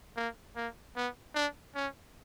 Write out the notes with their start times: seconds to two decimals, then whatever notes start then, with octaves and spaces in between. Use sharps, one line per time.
0.17 A#3
0.56 A#3
0.96 B3
1.35 D4
1.75 C#4